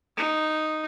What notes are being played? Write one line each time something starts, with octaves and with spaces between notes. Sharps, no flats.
D#4